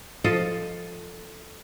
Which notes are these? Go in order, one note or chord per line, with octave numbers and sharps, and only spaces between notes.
F3 F4 A4 D#5